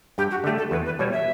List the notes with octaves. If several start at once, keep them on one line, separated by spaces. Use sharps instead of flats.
G2 G4
F#4
D3 A3 G4
A4
E2 B4
B4
B2 G3 C#5
E5